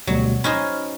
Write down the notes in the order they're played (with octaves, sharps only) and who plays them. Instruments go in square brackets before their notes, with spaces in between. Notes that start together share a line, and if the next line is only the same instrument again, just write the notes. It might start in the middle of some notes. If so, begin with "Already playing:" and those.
[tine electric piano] D2 B2 G3 [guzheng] F#3
[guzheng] C#4 D#4 C5 [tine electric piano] B5 F6